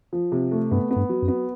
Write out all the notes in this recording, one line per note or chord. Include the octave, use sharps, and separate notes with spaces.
F3
C3
A3
G2 B3
B3
G2
F#3
F#2
B3